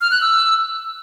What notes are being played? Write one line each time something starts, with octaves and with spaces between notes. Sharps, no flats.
F6
F#6
E6